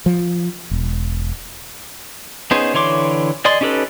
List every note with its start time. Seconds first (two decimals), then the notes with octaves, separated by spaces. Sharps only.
0.06 F3
0.71 E1
2.51 B3 C#4 D#4 G#4 C5
2.74 D3 E3 C#5 C6 D6
3.45 G#4 D5 D#5 C6
3.61 C#4 D#4 G4 A4 B4